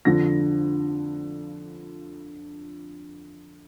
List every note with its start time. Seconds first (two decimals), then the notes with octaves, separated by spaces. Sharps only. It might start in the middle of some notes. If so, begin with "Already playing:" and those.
0.05 F2 D3 F3 A#6